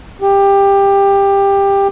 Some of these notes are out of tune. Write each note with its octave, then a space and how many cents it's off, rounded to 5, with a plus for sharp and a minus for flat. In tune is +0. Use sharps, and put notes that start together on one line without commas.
G4 +15